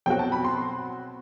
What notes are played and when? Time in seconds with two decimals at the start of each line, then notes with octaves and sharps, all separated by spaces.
0.06 B2 F#3 C4 F#4 G5
0.19 A5
0.32 B5
0.44 C6